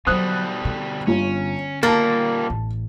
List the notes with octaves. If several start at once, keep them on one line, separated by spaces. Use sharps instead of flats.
B2 D3 F#3 G3 C5 D#6 F#6
D3
G1 C#4 F4
A#2 G3 A#3 A5 A6
A1